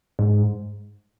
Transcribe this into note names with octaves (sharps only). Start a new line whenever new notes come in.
G#2